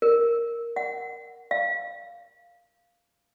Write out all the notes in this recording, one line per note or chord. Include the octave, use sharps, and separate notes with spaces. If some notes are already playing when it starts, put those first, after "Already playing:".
A#4
F#5
F5